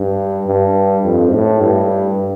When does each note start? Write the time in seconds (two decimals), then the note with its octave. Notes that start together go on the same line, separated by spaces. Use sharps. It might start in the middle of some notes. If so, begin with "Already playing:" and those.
Already playing: G2
0.47 G2
1.04 F2
1.33 A2
1.61 G2